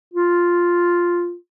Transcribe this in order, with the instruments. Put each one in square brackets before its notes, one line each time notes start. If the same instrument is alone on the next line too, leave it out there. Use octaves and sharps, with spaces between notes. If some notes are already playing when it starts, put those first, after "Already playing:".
[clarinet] F4